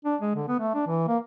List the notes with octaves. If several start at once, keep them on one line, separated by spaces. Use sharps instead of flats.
D4
G#3
D3
B3
A3
D4
E3
A#3